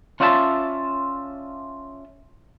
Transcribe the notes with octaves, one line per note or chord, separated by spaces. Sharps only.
C#4 F4 D5 E5 F#5 A5